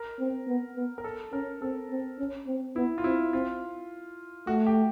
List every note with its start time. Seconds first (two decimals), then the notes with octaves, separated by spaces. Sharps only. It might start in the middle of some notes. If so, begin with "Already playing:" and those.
Already playing: A#4
0.19 C4
0.48 B3
0.76 B3
0.98 A#4
1.04 A4
1.33 C#4 A#4
1.61 C4 A4
1.90 C4
2.19 C#4
2.47 C4
2.76 B3 E4
2.98 F4
3.04 C4 E4
3.33 C4 F4
4.47 A3 F#4
4.66 G4